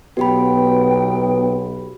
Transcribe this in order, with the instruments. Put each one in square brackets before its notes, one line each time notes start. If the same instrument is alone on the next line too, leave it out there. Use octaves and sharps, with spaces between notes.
[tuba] B1 [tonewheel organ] B3 [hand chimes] F#4 G4 B5 [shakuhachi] G5